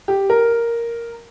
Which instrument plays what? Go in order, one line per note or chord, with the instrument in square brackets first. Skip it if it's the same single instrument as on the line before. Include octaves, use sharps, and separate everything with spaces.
[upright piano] G4
A#4